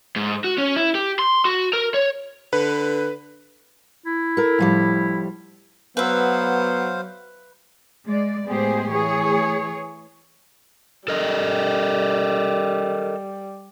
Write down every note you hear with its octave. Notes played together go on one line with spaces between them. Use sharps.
G#2
F#4
C#4
E4
G4
C6
F#4
A#4
C#5
D3 B4
E4
A4 A#4
A2 F3 G3
F#3 B3 B4 C5 E5 F5
G#3 D5
A2 G#3 B3 G4 G#4 C5
E3 A3 G#4 C#5
G3 A4 A#4 D#5